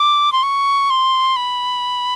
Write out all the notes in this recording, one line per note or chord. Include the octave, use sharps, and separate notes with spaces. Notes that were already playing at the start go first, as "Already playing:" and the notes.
Already playing: D6
C6
C#6
C6
B5